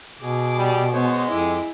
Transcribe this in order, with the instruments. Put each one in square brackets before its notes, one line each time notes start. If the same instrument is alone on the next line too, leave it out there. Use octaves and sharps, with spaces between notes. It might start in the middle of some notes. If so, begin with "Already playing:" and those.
[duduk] B2 [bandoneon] G#4 [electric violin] D6
[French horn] G3
[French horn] G#3 [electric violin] B3 [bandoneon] C5 C#5
[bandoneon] F2 D6 [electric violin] E4